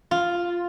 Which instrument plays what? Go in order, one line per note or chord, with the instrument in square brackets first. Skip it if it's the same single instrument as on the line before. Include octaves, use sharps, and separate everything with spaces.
[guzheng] F4